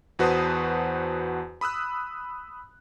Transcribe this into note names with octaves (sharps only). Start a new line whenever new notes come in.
E2 F#4 B4 C5 A5 D#6
B5 D#6 E6 F#6